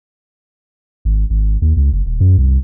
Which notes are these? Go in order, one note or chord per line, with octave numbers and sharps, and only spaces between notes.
G#1
G#1
D#2
C#2
F#1
D#1
F#2
C2